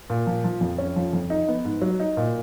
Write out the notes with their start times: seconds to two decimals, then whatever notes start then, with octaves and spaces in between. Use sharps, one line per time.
0.10 A#2
0.27 F3
0.44 F3
0.61 F2
0.78 C#4
0.96 F3
1.13 F2
1.30 D#4
1.48 B3
1.65 G#2
1.82 F#3
2.00 D#4
2.17 A#2